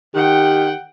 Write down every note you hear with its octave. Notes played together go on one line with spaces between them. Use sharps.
D#3 G4 F#5 G5